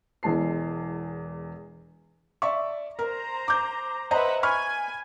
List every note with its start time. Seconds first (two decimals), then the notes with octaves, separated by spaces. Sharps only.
0.23 E1 E2 G#3 A5 C7
2.42 D5 E5 C#6
2.99 A#4 C5 A#5
3.48 D6 G6
4.11 B4 C5 D#5 E5 F#5 A#5
4.43 G#5 B5 C#6 F6